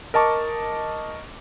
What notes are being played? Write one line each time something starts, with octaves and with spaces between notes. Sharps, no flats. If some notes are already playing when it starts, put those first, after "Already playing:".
A#4 D#5 A5 C#6 D6